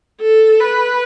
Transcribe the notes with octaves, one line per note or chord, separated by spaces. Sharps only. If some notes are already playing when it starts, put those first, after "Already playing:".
A4
B4